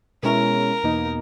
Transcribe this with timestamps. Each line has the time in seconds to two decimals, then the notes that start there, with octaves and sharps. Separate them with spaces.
0.23 B2 G#3 C#4 E4 A#4
0.83 E2 B2 A#3 D#4